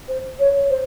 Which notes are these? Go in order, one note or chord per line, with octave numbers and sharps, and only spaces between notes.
C5
C#5
C5